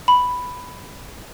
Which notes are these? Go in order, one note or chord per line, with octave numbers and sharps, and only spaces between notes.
B5